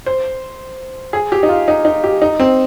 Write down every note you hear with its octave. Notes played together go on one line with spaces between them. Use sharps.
C5
G#4
G4
D#4
F4
D#4
D#4
G4
D#4
C4